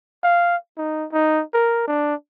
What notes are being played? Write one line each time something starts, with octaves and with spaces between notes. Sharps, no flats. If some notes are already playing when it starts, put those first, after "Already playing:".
F5
D#4
D#4
A#4
D4